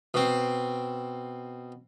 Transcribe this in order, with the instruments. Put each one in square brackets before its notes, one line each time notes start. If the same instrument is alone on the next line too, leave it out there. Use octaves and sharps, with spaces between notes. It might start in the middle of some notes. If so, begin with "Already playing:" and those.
[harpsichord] B2 C4